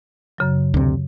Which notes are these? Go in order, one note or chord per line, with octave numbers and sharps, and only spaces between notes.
F#2 C#3 F#3
D2 C3